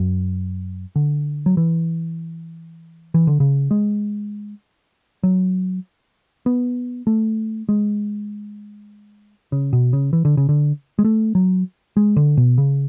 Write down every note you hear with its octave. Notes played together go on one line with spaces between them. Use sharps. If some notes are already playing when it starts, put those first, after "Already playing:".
Already playing: F#2
D3
F#3
E3
E3
D3
C#3
G#3
F#3
B3
A3
G#3
C#3
B2
C#3
E3
D3
C#3
D3
G#3
A3
F#3
G#3
D3
B2
C#3